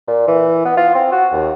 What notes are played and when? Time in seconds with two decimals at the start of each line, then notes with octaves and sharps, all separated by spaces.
0.07 A#2
0.28 E3
0.65 B3
0.77 F4
0.95 C4
1.12 F#4
1.32 D#2